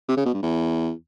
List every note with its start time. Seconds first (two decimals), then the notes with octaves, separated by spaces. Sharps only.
0.08 C3
0.17 C#3
0.25 B2
0.34 G2
0.42 E2